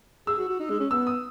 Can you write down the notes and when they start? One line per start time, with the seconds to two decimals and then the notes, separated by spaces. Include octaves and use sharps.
0.27 G#4 E6
0.38 F#4
0.48 F#4
0.60 D#4
0.70 G#3
0.80 C#4
0.91 B3 E6
1.07 D#6